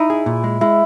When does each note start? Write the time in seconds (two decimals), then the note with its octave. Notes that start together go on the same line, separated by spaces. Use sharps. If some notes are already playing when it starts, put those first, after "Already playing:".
Already playing: D#4 E4
0.10 G#4
0.26 A#2
0.44 G#3
0.61 G#3 E4